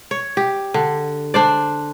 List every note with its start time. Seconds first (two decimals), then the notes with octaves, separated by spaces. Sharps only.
0.11 C#5
0.37 G4
0.74 D3
1.34 D4 C5 D5